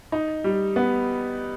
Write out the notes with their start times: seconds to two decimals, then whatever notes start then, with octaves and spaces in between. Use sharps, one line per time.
0.12 D#4
0.44 G3
0.76 B3